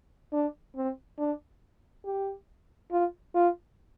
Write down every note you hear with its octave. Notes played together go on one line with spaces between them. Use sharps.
D4
C4
D4
G4
F4
F4